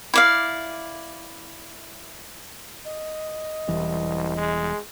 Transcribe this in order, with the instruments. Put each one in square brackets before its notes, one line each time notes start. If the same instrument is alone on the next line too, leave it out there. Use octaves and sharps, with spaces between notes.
[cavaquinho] E4 D5 F5
[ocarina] D#5
[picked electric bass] E1 E3 G3 [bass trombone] C2
[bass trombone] G#3